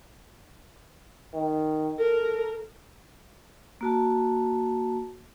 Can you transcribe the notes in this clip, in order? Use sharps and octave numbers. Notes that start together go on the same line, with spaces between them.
D#3
A4 A#4
A#3 F#4 A5